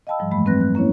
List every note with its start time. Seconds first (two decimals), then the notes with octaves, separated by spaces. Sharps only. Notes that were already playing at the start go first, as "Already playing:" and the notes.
0.07 D#5 F5 G5 A5 B5 E6
0.19 G#2 F3 G3
0.31 F#2 E3 G#3 A3 B5
0.46 F#3 C4 B4 F#6 A#6
0.61 F#6
0.75 A#3 C#4 E4 C#5